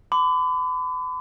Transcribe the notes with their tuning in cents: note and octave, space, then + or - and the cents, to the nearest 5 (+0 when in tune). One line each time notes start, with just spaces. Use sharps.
B5 +40 D6 +0